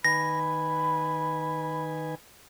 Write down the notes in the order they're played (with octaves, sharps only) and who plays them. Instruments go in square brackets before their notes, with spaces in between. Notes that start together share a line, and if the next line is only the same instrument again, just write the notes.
[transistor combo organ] D#3 B4 G#5 [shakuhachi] B5 [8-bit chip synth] A#6